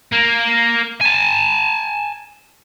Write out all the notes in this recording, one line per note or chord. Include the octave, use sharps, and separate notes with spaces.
A#3
G#5 A5